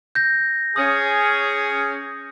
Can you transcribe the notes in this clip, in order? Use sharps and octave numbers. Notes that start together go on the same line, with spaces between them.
G6 A#6
C#4 G#4 D#6